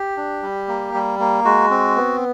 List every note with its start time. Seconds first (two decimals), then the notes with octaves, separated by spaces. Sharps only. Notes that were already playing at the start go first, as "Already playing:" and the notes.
Already playing: G4
0.17 D4
0.43 G3
0.68 A#3
0.94 G3
1.20 A#3
1.45 G#3 F#4
1.70 C4
1.96 B3